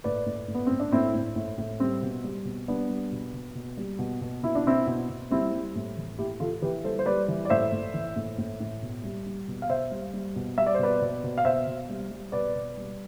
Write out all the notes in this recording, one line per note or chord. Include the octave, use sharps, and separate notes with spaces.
A2 B4 D5
A2
A2
B3
A2 C4
D4
A2 C4 E4
A2
A2
A2
G3 C4
B2
G3
B2
G3 B3 D4
G3
B2
B2
B2
G3
B2
B2
B2 E4
D4
B2 C4 E4
B2
B2
G3 C4 E4
G3
A2
E3
A2 E4 G4
E3 F4 A4
E3 G4 B4
G3 A4 C5
C5
G3 B4 D5
E3
D5
A2 C5 E5
A2
E3
A2
A2
A2
B2
G3
G3
B2
F5
B2 C5 E5
G3
G3
B2
G3 E5
D5
C5
B2 B4 D5
B2
B2
F5
B2 C5 E5
B2
G3
G3
B2 B4 D5
B2
G3